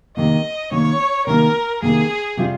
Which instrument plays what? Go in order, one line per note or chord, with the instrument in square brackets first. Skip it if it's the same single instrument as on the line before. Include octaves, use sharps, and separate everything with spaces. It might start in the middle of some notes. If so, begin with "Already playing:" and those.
[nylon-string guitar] C3 D#3 A#3 [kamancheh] D#5
[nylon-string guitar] C3 D#3 A#3 [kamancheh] C#5
[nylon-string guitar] C3 D#3 A#3 [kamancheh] A#4
[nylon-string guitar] C3 D#3 A#3 [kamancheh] G#4
[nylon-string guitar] C3 G3 C4 F4